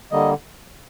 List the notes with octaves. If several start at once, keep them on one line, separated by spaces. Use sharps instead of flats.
D3 G3 A#3 D#5